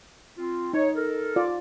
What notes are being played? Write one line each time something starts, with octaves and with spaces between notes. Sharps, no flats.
C4 F4
D#4 C#5
A4 A#4
F4 D5